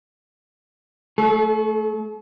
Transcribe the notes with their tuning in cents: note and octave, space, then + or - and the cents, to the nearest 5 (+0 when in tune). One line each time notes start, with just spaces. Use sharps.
A3 +0 A4 -45